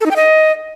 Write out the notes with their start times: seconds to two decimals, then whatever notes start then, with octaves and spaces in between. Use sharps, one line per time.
0.01 A4
0.06 D#4
0.11 G5
0.16 D#5